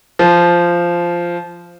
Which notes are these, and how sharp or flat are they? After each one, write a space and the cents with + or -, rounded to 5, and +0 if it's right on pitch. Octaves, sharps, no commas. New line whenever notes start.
F3 -10